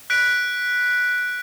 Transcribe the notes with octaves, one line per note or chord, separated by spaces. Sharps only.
F#6 B6 D7